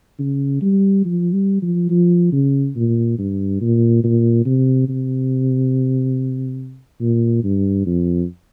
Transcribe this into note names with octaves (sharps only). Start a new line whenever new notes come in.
C#3
G3
F3
G3
F3
F3
C#3
A#2
G2
A#2
A#2
C3
C3
A#2
G2
F2